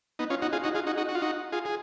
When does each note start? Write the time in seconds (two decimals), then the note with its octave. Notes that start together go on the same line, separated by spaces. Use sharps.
0.19 B3 D#4
0.30 C#4 F4
0.42 D#4 F#4
0.52 F4 G#4
0.63 D#4 F#4
0.75 F4 G#4
0.87 D#4 F#4
0.97 D#4 F#4
1.09 F#4
1.15 F4
1.22 D#4 F#4
1.52 F4 G#4
1.65 G#4